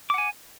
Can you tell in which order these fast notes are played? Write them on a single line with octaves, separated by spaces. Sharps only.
D6 F#5 G#5